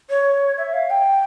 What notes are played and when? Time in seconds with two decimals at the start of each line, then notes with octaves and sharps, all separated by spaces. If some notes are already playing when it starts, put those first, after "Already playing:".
0.10 C#5
0.58 E5
0.74 F5
0.90 G5